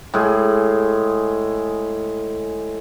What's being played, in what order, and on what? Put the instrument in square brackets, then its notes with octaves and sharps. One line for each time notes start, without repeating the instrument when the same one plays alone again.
[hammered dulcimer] A2 G#3 G#4